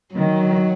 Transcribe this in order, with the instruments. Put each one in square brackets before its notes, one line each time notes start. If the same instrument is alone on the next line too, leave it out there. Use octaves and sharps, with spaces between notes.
[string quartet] D#3 [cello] F#3